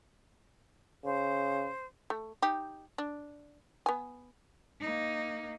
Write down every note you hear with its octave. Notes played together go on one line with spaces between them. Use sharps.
C#3 C5
A3
D#4 G4
D4
B3 G#5
A#3 D#4